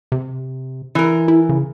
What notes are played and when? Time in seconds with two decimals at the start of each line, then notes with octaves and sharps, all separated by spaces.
0.12 C3
0.95 E3 A#4
1.28 E4
1.49 C#3